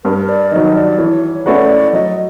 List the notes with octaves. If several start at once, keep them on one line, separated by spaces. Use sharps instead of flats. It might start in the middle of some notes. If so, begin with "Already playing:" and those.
G2 A#4
D5
D#3 F#3 D#5
D5
E3 C#5
A3 C#4 F#4 B4 D5
F#3 D#5